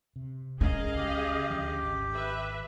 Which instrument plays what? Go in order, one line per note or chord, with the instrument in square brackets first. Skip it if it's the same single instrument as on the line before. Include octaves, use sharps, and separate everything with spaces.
[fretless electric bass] C3
[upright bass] C#4 [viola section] G#4 D#5 F5 [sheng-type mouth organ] A#4
[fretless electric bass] C#2 [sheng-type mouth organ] G4
[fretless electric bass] D2 D3 F3
G#1
[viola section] B4 E5